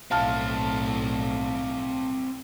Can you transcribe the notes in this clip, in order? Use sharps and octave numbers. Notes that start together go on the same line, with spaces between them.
B1 A2 C4 E4 F5 A5 F6